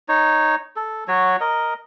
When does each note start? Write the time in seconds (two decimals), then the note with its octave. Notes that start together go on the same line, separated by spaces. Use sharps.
0.09 D#4 C#5
0.76 A4
1.08 F#3 F#4 C#5
1.41 A#4 D#5